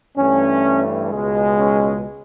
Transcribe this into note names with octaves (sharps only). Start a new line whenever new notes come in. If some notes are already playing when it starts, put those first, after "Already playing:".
G2 E3 A3 C#4
C#2 B2 G#3
C#4